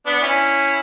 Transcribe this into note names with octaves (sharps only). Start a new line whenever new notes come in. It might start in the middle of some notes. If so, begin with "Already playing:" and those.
B3 D4
C#4 E4